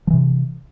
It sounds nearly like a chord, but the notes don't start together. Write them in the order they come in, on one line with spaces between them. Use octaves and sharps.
F3 E3 C3